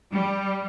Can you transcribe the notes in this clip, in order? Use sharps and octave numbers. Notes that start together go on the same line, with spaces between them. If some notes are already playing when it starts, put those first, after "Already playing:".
G3